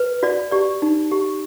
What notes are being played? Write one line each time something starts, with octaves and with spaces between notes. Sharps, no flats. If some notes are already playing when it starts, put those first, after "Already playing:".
Already playing: B4
F#4 D5
G4 D5
D#4
G4